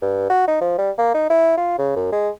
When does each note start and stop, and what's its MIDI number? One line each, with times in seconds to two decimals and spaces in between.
0.02 0.25 43
0.30 0.46 66
0.48 0.57 63
0.61 0.74 53
0.78 0.91 55
0.98 1.11 58
1.15 1.29 63
1.30 1.57 64
1.57 1.77 65
1.78 1.92 49
1.96 2.08 42
2.12 2.30 56